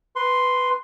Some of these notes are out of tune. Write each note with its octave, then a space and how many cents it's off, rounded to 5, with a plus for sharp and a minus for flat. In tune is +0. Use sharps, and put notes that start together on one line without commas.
B4 +5 C6 +0